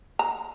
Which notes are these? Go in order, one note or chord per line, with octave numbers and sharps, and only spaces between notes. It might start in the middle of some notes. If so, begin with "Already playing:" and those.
A#5